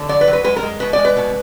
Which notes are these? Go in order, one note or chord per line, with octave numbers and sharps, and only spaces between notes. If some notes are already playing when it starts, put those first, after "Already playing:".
Already playing: D3
F#3 D5
B4
F#3
B4
G#3 B4
A#4
G#3
B2 B4
G#3 D5
B4
B2